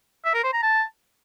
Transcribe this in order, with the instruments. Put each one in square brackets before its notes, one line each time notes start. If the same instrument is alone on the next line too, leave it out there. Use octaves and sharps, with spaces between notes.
[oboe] E5
A#4
C5
A#5
A5